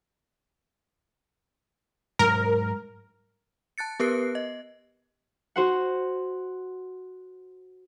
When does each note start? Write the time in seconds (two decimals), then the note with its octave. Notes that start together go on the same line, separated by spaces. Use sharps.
2.19 G#2 F#3 A#4
3.78 A5 F#6 A6 C#7
4.00 B3 G4 A#4 B4 F#6 C7
4.35 D#5
5.56 F#4 C5 F#5